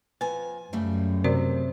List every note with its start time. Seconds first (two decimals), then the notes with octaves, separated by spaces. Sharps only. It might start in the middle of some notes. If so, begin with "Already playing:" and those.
0.21 F2 B4 G#5
0.73 F#2 C#3 G3 A3
1.24 C3 F#4 A#4 D5